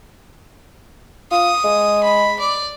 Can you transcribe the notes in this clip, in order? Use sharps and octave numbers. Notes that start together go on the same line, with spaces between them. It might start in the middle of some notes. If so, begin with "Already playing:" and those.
F4 D#6
G#3
B5
D5